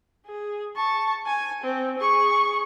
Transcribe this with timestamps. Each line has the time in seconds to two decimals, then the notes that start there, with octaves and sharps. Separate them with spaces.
0.27 G#4
0.76 A5 C#6
1.27 G#5
1.64 C4
1.99 G#4 C#6